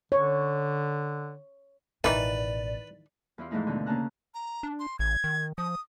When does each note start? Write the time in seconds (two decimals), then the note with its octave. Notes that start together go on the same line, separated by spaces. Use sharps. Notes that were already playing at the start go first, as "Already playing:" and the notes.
0.12 D3 C#5
2.04 A1 B2 D#3 E3 D#4 B4 D5
3.38 E2 E4 F4
3.51 G#2 E3 F3 A3 D#4 E4
3.67 D#2 B2 D3
3.86 C#3 A#3 C#4 A5 A#5 F#6
4.34 A#5
4.63 D4
4.80 C6
4.99 A1 G#6
5.24 D#3
5.58 F3 D#6